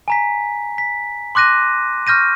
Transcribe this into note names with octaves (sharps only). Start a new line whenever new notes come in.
G#5 A#5 B6
B6
C6 D6 F#6 A#6 D#7
C#6 F6 G6 A#6 D#7